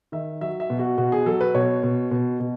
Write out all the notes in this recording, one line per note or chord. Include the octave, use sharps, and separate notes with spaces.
D#3 E5
F#3 E5
E5
B2
F#4
B2 F#4
G#4
F#3 A4
B4
B2 C#5
B2
B2
B2